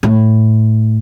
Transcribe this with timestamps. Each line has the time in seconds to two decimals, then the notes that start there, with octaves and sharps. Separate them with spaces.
0.03 A2